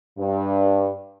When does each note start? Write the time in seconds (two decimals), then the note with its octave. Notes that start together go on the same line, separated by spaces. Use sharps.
0.18 G2